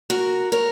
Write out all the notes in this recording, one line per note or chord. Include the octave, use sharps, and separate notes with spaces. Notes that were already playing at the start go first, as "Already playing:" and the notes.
F#4 A#4
A#4 C#5